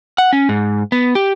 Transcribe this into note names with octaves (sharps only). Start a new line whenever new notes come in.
F#5
C#4
G#2
B3
G4